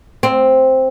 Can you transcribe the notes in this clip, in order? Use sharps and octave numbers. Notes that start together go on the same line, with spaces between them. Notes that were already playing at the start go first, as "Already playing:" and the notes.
C4